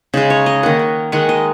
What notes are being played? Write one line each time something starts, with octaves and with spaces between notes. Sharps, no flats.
C#3 G#3 D#4
C#5
D#5
D#3 A#3 F#5
F#5
D#3 G#3 F#5
D#5